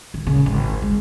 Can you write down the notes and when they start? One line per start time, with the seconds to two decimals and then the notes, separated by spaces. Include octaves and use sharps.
0.14 D#3
0.27 A#2 C#3
0.46 G#1
0.82 G#3